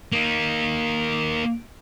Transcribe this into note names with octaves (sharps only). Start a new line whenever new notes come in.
A#3 D#4